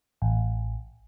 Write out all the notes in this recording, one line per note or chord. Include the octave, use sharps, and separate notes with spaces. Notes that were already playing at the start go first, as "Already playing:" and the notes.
A1